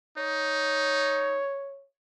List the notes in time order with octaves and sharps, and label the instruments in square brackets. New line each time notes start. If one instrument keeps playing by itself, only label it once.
[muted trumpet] D#4 [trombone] C#5